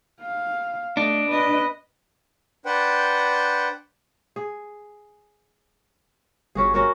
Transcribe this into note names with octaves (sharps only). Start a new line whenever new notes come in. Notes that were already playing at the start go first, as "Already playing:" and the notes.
F5
A3 D4 D#5
B4 D#5
D4 B4 C5 F#5 G5
G#4
G1 C#4 F#4 G#4
C#4 F#4 A#4